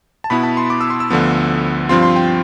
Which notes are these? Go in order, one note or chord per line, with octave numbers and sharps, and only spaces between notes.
A5
B2 B3 E4 B5
A5
C6
D6
E6
C6
E6
D2 D3 F3 B3
G2 F3 C4 F4 C6
C6
G5